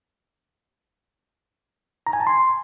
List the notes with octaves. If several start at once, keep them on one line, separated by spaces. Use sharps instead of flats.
A#5
G#5
A5
C6